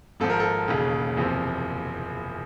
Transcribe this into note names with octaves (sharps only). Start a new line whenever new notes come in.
G#1 G#2 F3 A4
A#4
A4
E1 D#2 C#3
F#1 E2 C3 F3